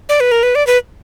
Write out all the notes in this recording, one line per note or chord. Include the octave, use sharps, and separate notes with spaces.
D5
B4
A#4
B4
D5
B4